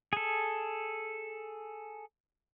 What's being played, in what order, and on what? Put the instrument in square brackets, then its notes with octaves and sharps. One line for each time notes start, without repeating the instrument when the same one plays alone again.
[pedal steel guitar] G#4 A4